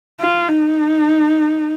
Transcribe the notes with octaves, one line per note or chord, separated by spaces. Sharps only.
F4
D#4